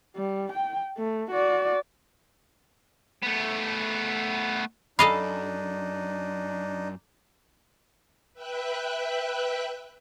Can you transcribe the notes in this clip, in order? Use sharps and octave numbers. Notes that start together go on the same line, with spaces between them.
G3
G5
A3
F#4 D5
A3 B3
F#2 D4 D#4 A4 D#5 F5 B5
B4 E5 G5 F#6